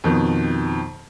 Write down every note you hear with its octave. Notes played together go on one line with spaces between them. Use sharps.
F2 B2 D#3